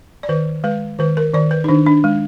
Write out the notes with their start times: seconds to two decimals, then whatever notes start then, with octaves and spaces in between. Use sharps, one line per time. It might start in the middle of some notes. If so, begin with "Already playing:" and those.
0.23 D5
0.29 D#3 B4
0.64 G#3 B4
0.99 D#3 B4
1.17 A#4
1.34 D#3 D5
1.51 B4
1.64 D#4
1.69 D#3 D4
1.86 D4
2.04 G#3